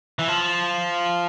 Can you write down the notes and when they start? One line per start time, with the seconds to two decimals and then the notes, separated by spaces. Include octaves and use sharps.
0.19 E3
0.28 F3